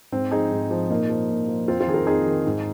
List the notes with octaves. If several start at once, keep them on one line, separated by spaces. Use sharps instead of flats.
G#2 C4
F3 D#4 G#4
G#2
F3
A#2 A#3 D#4
F3
A#2
F3
F2 C4 F4
C4 F4
D#3 G#4
F4 A#4
F2 D#4 G#4
D#3
G#2